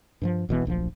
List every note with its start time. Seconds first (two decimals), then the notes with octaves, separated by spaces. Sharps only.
0.22 G2 E3 F3
0.49 E1 B2 E3 B3
0.65 D1 A#1 B2 F3